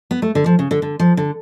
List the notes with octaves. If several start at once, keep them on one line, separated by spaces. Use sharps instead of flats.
B3
A3
D3
F3
C#3
D3
D3
F3
D3